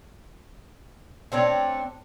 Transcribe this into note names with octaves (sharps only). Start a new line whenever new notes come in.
A3 C4 D4 C#5